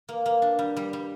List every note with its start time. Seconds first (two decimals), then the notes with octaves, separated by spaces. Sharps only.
0.09 A#3
0.26 A#3
0.42 D4
0.59 G3
0.77 G3
0.93 G3